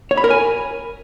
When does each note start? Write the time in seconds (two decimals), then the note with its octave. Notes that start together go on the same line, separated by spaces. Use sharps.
0.11 C#5
0.17 B5
0.24 A#4
0.30 G#5